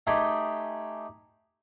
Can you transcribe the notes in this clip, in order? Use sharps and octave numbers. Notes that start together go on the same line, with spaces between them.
A3 D#4 G4 G#4